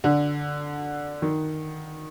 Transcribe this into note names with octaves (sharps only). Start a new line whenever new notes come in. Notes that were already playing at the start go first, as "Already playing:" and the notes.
D3
D#3